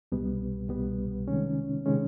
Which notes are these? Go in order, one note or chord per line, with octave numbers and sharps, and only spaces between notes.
C2 B2 G3 B3
C2 B2 G3 B3
C3 D#3 G#3 C#4
C3 D#3 G#3 C#4